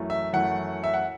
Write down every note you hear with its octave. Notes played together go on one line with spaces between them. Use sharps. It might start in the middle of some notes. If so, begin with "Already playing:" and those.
Already playing: F#2 E3 A3
E5
F#2 E3 A3 F#5
E5
F#5